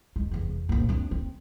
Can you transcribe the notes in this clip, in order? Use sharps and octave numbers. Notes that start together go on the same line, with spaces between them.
G#3
F1 E2
A#1 A#3
C4 D4
C4